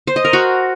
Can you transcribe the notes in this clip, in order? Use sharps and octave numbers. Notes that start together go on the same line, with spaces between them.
C5
D#5
A#4
F#4